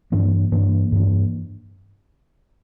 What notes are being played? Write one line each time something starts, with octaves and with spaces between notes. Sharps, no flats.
G2 E3 A#3 D4
G2 E3 A#3 D4
G2 E3 A#3 D4